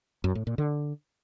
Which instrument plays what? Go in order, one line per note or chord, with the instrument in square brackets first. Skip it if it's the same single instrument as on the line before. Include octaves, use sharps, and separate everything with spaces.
[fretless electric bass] F#2
A2
A#2
D3